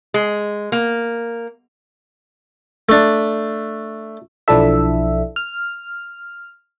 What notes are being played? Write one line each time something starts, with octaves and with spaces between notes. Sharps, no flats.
G#3
A#3
A3 D4
B1 F3 D4 E4 A4 E5
F6